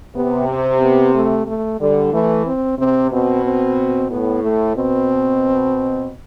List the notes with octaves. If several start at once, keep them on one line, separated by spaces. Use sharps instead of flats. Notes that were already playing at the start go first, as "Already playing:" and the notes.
C3 B3
C4
B3
A3
A3
D3 G3
E3 A3
C4
C3 C4
B2 C4
C4
A2 B3
A3
B2 C4